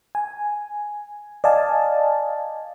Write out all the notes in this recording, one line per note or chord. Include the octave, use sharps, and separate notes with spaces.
G#5
D5 D#5 F5 G#5 A5